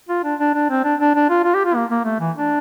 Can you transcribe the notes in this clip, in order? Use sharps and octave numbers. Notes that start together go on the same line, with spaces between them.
F4
D4
D4
D4
C4
D4
D4
D4
F4
F4
G4
F4
A#3
A#3
A3
E3
D4